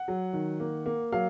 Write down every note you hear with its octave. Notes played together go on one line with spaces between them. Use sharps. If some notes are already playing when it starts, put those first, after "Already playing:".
Already playing: F#5
F#3
D#3
A#3
A#3
F#3 F5